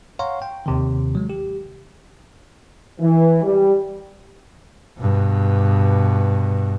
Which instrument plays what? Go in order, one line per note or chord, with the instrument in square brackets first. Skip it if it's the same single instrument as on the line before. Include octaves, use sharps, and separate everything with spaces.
[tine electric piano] C#5 F5 F#5 A#5 C6 C#6
G5
D#2 C3 D#3
F#3 G#3
G4
[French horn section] E3
G3
[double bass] G2 B2